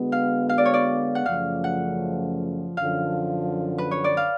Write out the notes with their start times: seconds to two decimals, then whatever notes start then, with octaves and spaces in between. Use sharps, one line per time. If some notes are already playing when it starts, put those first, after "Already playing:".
Already playing: D3 G#3 B3 F#4
0.12 F5
0.49 F5
0.58 D5
0.65 C#5
0.74 D5
1.15 F#5
1.25 F#2 C#3 F3 A3 F5
1.64 F#5
2.77 F#2 D3 F3 F5
3.78 B4
3.91 C#5
4.04 D5
4.17 F5